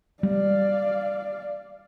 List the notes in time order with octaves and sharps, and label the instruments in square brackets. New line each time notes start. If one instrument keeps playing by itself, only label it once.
[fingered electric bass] G3 [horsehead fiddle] D5 F5